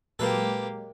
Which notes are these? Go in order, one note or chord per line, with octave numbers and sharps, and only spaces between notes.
A#2 F#3 G#3 A#3 G4 A4 B4